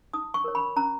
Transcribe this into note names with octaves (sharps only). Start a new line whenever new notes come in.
D#4 D#6
C#6
A#4 C#5
B5
C#4 A#5